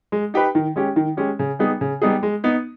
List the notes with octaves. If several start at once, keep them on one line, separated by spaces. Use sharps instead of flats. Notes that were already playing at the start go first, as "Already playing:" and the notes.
G#3
D#4 G4 B4
D#3
G#3 C#4 G4
D#3
G#3 C#4 G4
C#3
G3 B3 D#4 G#4
C#3
G3 B3 D#4 G#4
G#3
B3 D#4